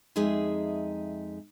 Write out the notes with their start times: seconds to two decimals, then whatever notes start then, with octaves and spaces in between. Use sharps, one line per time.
0.16 F2 G#3 D#4 G#4 E5